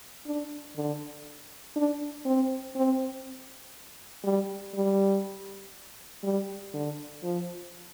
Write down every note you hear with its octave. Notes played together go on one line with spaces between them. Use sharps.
D4
D3
D4
C4
C4
G3
G3
G3
D3
F3